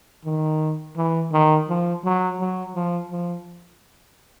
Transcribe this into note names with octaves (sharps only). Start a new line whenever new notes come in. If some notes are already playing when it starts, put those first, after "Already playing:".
D#3
E3
D#3
F3
F#3
F#3
F3
F3